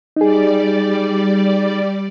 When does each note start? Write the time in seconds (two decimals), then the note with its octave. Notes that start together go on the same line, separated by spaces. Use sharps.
0.16 G3 D#4 G#4 D5